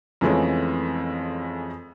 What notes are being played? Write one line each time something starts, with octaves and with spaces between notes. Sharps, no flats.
F2 E3 G#3 A3 C#4